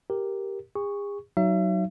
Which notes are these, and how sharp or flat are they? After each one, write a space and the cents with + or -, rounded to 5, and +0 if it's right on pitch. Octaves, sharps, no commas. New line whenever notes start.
G4 +0 A#4 +0
G#4 -40 C#6 +0
F#3 +15 D#4 +0 E5 +40